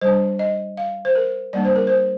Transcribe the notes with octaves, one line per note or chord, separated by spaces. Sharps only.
G3 D4 C5
D#5
F5
C5
A#4
G3 A#3 D4 D5
C5
A#4
C5